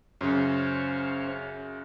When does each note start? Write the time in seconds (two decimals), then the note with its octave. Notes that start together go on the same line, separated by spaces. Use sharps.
0.21 F#2 C#3 C#4 C5 C#5